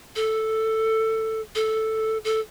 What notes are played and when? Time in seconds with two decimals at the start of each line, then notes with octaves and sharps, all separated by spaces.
0.16 A4
1.55 A4
2.24 A4